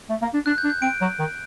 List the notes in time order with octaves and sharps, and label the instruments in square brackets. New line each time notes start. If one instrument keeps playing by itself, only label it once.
[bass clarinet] A3
A#3
D4
[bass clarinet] D4 [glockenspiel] F#6
[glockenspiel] G6
[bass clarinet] D4
[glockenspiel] G6
[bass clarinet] C4 [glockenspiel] D7
[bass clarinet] F#3
D#3